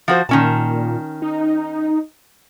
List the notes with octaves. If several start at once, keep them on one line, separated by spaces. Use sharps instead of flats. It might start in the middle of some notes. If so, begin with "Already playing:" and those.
F3 F#4 C5
A#2 D#3 C#4 A5
D#4